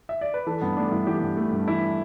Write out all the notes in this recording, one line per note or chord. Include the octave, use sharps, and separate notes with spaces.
E5
D5
B4
E3 A4
G2 B3
A3 D4
G2 E4
E3 G4
G2
A3
G2
E3 E4